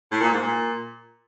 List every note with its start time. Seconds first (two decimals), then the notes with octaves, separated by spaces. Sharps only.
0.10 A2
0.21 A#2
0.32 G#2
0.43 A#2